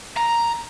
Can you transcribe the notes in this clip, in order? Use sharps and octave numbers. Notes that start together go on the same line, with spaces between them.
A#5